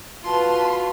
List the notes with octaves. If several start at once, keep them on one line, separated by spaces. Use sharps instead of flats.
F4 F#4 B4 A5 C6